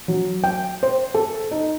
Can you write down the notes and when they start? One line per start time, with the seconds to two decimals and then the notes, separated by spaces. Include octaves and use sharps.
0.08 F#3
0.44 G5
0.83 C5
1.14 A4
1.51 D#4